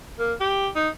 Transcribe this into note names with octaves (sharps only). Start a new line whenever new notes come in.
A#3
G4
D#4